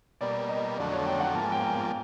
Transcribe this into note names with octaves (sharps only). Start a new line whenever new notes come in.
B2 G3 A#3 D5
D#5
F2 D3 F#3 A3 D5
C#5
G5
F#5
G#2 F3 A#3 A5
G#5
G5
G#5